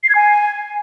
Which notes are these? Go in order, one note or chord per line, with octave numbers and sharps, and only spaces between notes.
C7
G#6
G#5